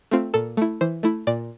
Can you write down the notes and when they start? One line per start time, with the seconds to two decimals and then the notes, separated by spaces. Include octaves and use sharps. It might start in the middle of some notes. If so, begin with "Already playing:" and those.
0.11 A3 C4 F4
0.34 A#2 A4
0.57 A3 E4
0.81 E3 C5
1.03 A3 E4
1.27 A#2 D5